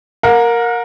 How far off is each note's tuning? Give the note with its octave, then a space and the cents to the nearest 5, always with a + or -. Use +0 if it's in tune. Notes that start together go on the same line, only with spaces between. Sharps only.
A#4 +0 F#5 -45